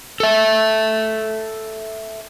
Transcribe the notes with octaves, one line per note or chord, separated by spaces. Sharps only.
A4 E5